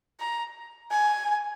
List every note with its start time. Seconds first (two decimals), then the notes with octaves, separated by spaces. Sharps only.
0.20 A#5
0.91 G#5